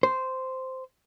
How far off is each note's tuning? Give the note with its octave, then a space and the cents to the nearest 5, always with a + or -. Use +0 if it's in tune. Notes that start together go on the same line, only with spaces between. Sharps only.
C5 -10